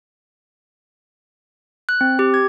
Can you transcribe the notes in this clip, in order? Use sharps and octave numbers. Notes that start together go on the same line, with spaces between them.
F#6
C4
G4
G#6